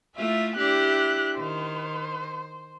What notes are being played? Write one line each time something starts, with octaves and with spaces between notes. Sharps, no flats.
A3 E4 F4 E5
D4 E4 G4 F#6
D#3 C5